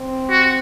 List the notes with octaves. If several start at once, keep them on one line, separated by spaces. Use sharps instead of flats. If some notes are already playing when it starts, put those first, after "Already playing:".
Already playing: C4
F#4